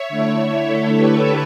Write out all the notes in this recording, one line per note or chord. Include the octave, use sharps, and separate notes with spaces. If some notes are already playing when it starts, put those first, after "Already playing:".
Already playing: C#5 E5
D3 A3 E4
A4 C#5
G4 B4